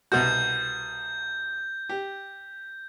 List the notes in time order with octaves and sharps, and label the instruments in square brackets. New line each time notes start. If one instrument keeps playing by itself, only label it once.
[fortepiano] C2 B2 F#4 [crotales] G6
[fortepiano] G4